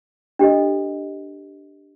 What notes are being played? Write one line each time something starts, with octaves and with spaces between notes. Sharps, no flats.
D4 G4 A4 D#5